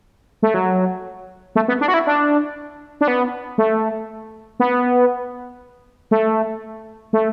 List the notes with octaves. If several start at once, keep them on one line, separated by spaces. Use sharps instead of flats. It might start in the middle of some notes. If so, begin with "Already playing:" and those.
A3
F#3
A3
B3
D4
F#4
E4
D4
D4
B3
A3
B3
A3
A3